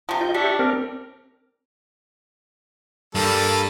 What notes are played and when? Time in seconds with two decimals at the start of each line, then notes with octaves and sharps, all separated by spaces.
0.09 C3 F3
0.21 F4 D#5 G6
0.34 D4 G4 E5 C#6
0.59 C4 A#4
3.15 G2 G3 A#3 A4